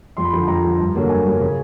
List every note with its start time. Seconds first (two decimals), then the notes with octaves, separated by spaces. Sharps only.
0.17 F2 C6
0.25 B5
0.33 D3 F3 C6
0.48 F2 A#5
0.63 D3 F3
0.78 G2
0.95 D3 F#3 A#3
1.09 G2 G#5
1.25 D3 F#3 A#3
1.41 C#3